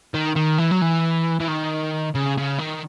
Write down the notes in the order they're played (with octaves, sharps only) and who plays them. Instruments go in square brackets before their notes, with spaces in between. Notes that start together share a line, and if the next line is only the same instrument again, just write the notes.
[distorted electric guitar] D#3
D#3
E3
F#3
E3
E3
D#3
C#3
C#3
D#3